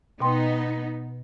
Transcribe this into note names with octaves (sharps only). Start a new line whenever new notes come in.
B2 B3 D#4 G5 C6